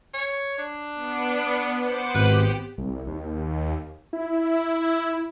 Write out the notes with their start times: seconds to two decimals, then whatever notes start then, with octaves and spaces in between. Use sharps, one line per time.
0.14 C#5
0.58 D4
0.95 B3
1.79 C5 F#5 D6
2.15 G#1 G4 B4
2.78 C2
3.07 D#2
4.13 E4